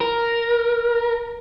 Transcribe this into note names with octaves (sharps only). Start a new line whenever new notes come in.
A#4